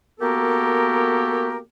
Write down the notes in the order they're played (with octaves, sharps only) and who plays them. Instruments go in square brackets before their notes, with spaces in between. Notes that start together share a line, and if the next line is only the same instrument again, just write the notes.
[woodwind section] A#3 B3 F#4 G4 A4 A#4